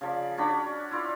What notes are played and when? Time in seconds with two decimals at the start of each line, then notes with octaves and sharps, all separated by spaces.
0.01 C#3 F3 D5
0.38 C#4 D4 F#4 B5
0.91 E4 F4 D5